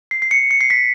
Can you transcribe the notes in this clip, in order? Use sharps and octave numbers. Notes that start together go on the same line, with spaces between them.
C7
C7
C#7
C#7
C7
B6